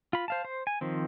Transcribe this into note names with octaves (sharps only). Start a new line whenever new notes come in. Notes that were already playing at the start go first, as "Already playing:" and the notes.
F4 B5
C5 F5 A5
C5
G#5
D#3 F3 C4